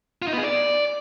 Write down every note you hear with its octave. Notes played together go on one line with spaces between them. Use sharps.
F4
D#4
B3
G#4
D5